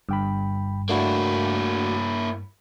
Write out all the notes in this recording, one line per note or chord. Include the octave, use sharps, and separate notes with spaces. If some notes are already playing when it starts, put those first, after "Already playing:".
G1 G2 G5 B5
A3 A#3 D4 E4 F#4